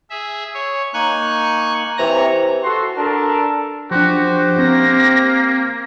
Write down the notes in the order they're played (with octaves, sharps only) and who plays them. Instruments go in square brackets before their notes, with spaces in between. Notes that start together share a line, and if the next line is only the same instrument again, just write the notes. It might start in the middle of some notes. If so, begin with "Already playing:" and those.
[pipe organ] G#4 E5
C#5
[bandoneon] A#3 D#4 [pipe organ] G#5 C#6 F#6
[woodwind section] C3 E3 [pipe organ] C#5 A#5 A#6
[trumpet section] F#4 A4 C6
D4 A4 A#4 A5
[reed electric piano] F3 D4 [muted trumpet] F#4 [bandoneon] G4 C5
[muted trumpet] A#3 [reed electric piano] C4 [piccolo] A#6